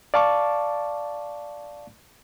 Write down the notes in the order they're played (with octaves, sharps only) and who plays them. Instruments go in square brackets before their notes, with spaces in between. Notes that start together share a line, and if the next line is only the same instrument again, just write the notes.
[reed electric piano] D5 F5 A5 C#6 D6